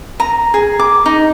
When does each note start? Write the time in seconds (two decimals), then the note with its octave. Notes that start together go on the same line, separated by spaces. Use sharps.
0.20 A#5
0.54 G#4
0.79 D6
1.06 D#4